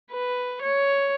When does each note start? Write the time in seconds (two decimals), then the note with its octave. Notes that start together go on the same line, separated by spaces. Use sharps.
0.11 B4
0.63 C#5